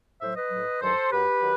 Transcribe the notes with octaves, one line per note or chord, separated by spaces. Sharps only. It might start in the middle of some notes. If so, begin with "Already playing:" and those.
A2 F#3 C5 E5
B4 D#5
A2 F#3
G2 D#3 F#3 A4 C5
F#2 F#3 G4 B4
D#3 F#3